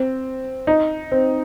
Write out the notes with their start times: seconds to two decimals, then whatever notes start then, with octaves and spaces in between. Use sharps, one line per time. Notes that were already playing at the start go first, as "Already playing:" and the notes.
Already playing: C4
0.67 D#4
1.12 C4